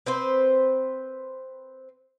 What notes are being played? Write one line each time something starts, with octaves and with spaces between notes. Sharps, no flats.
C4 B4 C5